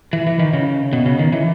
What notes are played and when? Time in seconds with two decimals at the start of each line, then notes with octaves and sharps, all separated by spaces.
0.13 E3
0.27 E3
0.39 D#3
0.53 C#3
0.93 B2
1.06 C#3
1.19 D#3
1.33 E3